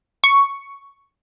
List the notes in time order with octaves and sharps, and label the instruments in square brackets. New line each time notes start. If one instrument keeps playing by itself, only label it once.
[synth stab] C#6